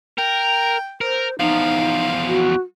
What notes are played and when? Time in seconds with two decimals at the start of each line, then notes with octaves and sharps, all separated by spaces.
0.18 A#4 G5
1.01 A#4 C5
1.40 E2 F3 D#4 F5
2.27 F#4